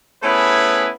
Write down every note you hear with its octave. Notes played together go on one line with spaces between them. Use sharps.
A3 B3 C#4 E4 G#4 B4